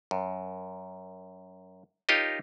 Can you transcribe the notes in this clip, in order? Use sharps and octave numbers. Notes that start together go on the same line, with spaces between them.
F#2
D#4 F4 G4 A#4 C#5 D#5